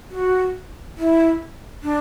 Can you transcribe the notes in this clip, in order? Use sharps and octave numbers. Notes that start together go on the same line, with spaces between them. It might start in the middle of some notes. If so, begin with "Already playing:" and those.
F#4
E4
D4